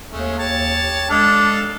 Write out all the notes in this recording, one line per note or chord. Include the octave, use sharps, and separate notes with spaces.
D#2 G#3 A3 C#4
G4 C#5 A5
G#3 D4 A4 D#5 F5